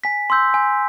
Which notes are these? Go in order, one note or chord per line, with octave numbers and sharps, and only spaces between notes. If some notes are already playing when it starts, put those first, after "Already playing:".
G#5 B6
C6 E6 G6
G#5